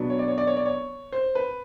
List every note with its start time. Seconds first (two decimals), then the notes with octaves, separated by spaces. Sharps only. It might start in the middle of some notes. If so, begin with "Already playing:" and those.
Already playing: B2 F#3 B3 D4
0.10 C#5
0.19 D5
0.28 C#5
0.38 D5
0.47 C#5
0.57 D5
0.66 C#5
1.12 C5
1.35 B4